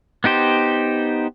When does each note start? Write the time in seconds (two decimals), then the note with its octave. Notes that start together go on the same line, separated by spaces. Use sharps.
0.24 B3 D#4 G4 C5